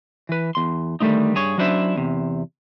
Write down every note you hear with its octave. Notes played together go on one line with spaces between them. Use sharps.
E3 B4
E2 C6
D3 D#3 G3 A3 C4 D#4
G2 G#4 C#5
F#3 C#4 D4 E4 C5 E5
E2 C3